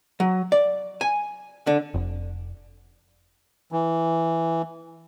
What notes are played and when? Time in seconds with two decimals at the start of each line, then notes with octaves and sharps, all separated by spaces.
0.20 F#3
0.52 D5
1.01 G#5
1.67 D3
1.94 F1
3.72 E3